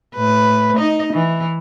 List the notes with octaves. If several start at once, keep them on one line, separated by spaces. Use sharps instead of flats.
A2 B4
D#4 D#5
E3